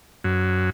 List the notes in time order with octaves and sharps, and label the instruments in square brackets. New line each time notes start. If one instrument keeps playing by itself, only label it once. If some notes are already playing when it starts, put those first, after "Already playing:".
[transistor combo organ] F#2